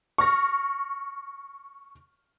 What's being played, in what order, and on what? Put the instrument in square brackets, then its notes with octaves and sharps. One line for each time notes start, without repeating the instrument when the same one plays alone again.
[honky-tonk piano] C#6 F6 A#6